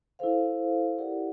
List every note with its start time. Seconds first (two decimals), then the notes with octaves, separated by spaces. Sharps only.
0.19 E4 A4 C5 F5
0.98 E4 G4 A#4 D5 F#5